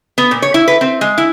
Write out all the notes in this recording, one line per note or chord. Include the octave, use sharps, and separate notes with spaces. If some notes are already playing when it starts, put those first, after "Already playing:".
B3
A#2
C#5
E4
B4
C4
G#3
E4